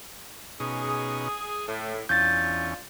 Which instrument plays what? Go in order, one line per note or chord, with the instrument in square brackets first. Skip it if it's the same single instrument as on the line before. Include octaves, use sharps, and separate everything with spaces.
[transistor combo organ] B2 C#4 D#4 [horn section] G#4
[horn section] A2 [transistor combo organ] A3
[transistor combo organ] E2 C#4 [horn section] D4 F4 [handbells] G6 A6